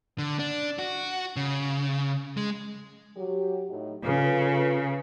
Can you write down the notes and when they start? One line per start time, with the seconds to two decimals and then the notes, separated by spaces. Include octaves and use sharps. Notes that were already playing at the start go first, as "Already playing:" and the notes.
0.19 D3
0.39 D4
0.79 F#4
1.36 C#3
2.37 G#3
3.16 F#3 G4
3.70 A2 D#4
4.04 C#3 F4 A4 B4